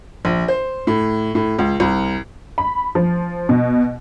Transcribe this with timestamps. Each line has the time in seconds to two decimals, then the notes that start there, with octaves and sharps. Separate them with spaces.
0.25 A#1
0.48 C5
0.87 A2
1.35 A2
1.59 C#2
1.80 C2
2.58 B5
2.95 F3
3.49 B2